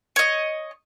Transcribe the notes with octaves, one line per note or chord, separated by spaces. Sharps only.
C#5 D#5